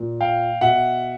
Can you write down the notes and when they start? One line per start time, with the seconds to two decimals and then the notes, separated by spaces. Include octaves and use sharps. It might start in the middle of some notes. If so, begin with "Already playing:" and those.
Already playing: A#2
0.21 F5 G5
0.61 B2 E5 F#5